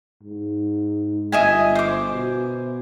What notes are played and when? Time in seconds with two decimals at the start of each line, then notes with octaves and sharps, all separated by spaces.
0.23 G#2
1.32 G1 D#5 E5 G#5
1.75 C5 D6
2.12 B2